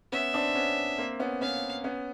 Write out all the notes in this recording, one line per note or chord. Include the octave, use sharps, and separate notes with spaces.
B3 C#4 E5
C4 D4
B3 C#4
A#3 C4
B3 C#4
B3 C#4 F5
B3 C#4